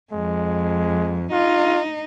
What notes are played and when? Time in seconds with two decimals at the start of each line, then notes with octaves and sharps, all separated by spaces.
0.13 F2 G#3
1.32 D#4 F4